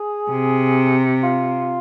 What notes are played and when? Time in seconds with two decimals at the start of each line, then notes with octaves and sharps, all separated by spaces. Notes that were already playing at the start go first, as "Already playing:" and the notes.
Already playing: G#4
0.31 C3
1.23 F4